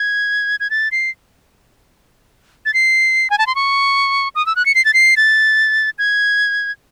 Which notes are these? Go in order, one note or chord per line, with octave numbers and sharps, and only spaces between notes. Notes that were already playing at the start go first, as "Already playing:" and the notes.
Already playing: G#6
G#6
A6
C7
A6
C7
G#5
A5
C6
C#6
D#6
E6
F#6
C#7
C7
A6
C7
A6
G#6